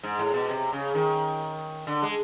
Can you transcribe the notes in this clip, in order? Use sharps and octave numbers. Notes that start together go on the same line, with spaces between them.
G#2
A2
B2
C3
C#3
D#3
D3
G#3